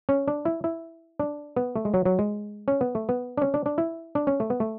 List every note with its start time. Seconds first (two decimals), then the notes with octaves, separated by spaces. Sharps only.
0.09 C#4
0.28 D4
0.45 E4
0.64 E4
1.19 D4
1.56 B3
1.76 A3
1.85 G#3
1.94 F#3
2.05 F#3
2.19 G#3
2.68 C#4
2.81 B3
2.95 A3
3.09 B3
3.37 D4
3.42 C#4
3.54 D4
3.66 D4
3.78 E4
4.15 D4
4.27 C#4
4.40 A3
4.50 B3
4.60 A3